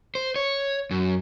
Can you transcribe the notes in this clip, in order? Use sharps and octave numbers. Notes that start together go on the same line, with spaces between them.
C5
C#5
F#2